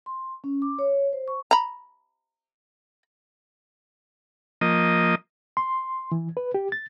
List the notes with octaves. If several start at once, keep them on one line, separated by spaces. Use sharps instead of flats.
C6
C#4
D6
C#5
C5
C#6
A#5 B5
F3 A#3 D#5
C6
E3
B4
G4
A6